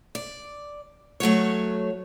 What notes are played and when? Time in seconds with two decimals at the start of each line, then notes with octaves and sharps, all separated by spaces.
0.15 D5
1.20 F#3 A3 F#4 C#5